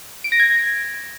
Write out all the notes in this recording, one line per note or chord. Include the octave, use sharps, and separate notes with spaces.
D7
A#6
G#6